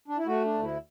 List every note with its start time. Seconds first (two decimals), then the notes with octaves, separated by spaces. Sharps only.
0.08 D4
0.18 E4
0.26 A3 F#4
0.45 D4
0.54 D2
0.62 E4